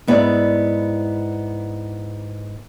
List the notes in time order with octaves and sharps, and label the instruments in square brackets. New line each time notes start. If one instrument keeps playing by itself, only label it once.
[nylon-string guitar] G#2 B3 E4 G#4 D5